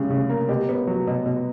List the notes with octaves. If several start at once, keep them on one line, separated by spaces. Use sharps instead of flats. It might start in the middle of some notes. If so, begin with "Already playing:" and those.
Already playing: C#3 G3
C#3
A#3
B2 G4
B3
F#3
B2
B2